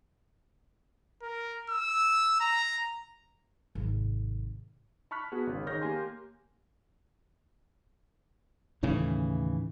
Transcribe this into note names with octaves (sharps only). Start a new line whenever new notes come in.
A#4
E6
A#5
G#1 C3
A5 B5 C#6 F6 F#6 B6
B3 F#4 G#4
G#1 C#3
D#3 G#4 C#5 F6 G6 A#6
A#3 G4 G#5 C6
D#2 A2 C#3 E3